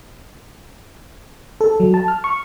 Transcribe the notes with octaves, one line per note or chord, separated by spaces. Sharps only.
A4
F#3
A5
F6
C#6